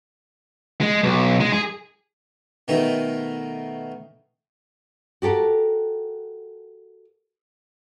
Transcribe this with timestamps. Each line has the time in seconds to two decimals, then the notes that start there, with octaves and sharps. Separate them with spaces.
0.81 G#3
1.03 B1
1.41 G#3
1.53 G#4
2.68 B2 D#3 A3 D#4
5.22 F#4 G4 A4 A#4